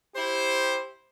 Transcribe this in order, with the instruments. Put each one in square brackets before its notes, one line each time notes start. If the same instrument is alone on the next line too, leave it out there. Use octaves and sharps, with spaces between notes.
[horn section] E4 G4 C5